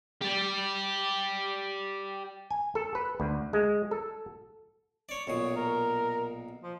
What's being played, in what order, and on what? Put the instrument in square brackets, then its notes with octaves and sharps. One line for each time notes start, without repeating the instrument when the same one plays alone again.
[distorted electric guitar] G4 D5
[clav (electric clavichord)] G#5
A4
B4
D2
G#3
A4
[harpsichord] C#5 D5
[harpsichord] B1 A#2 D#6 [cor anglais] C#5
[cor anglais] A#4
F3